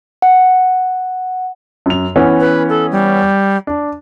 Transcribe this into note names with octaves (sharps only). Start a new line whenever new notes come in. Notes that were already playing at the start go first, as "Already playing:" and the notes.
F#5
F#2 F7
E3 B3 C#4
B4
A4
G3
D4